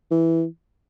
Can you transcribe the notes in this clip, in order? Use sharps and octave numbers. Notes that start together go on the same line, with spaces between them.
E3